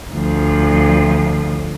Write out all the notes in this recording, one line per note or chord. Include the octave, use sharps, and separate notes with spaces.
D2 F3